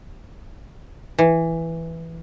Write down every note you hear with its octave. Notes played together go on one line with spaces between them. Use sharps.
E3